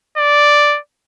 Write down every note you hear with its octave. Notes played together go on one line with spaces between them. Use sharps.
D5